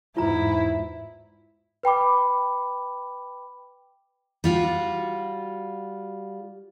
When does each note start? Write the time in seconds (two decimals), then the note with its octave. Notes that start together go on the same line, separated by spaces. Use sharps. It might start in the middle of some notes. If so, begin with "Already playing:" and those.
0.17 E2 G#2 E4 F4 A#5
1.83 B4 G5 B5 D6
4.44 G3 F4 F#4